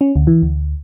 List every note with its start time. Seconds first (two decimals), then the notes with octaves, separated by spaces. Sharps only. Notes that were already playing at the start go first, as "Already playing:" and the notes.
0.01 C#4
0.16 D2
0.27 E3
0.42 D2